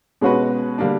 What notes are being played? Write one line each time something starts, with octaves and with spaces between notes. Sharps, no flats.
B2 G#3 C#4 F#4 B4
D3 G3 A#3 D4